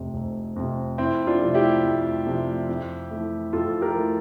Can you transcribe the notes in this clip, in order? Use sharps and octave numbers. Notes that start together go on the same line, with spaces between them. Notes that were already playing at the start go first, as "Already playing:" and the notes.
Already playing: F1 F2 C3
F1
F2 C3
F2 C4 E4
D4 F4
C3 F3 A3
E4 G4
F2
C3 F3 A3
F2
E3 A3
F2 F4 A4
G4 A#4
E3 A3